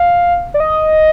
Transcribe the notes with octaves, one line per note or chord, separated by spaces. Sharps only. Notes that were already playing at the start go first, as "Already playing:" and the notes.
Already playing: F5
D5
D#5